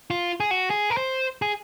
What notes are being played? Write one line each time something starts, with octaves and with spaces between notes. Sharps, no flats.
F4
G#4
F#4
G#4
A#4
C5
G#4